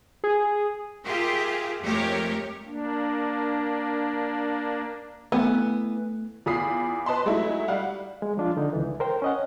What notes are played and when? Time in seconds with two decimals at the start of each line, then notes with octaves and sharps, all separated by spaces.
0.24 G#4
1.05 F4 G4 G#4 A#4 E5
1.82 F2 G#3 A3 G4 A#4 C#5
2.66 A#3 D4
5.32 E3 A3 B3
6.46 E2 F4 B5 D#6 C7
7.06 B4 D#5 A5 B5 C6
7.26 F#3 G#3 A3 D#4 E4
7.68 G3 F5 F#5
8.22 G#3
8.37 F3 D4 F4
8.57 D3 D#4
8.73 C#2 E3
9.00 A#4 C5 G5
9.22 C#4 D#5 F#5